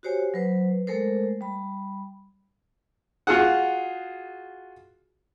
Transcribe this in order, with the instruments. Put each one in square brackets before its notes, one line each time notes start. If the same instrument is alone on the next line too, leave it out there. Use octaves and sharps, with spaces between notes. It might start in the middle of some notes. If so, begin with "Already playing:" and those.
[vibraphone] F#4 G4 C5 C#5 G#5
F#3 B4 C5
G#3 A3 A4 A#4 C5
G3 B5
[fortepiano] F4 F#4 G#4 F#5